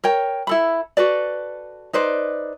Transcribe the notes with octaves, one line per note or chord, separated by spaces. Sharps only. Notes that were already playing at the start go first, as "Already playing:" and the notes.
A#4 C#5 G5
E4 A4 B5
F#4 A4 B4 D5
D#4 B4 C5 D5